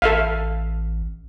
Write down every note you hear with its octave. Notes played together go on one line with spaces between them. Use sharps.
A1 A4 E5 F5